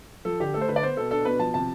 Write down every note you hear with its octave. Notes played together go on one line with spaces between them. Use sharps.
F3 A4
D3 G4
A3 A4
C5
D3 B4
D5
B3 C5
B2 A4
D4 A4
B2 B4
F3 A5
C3 A5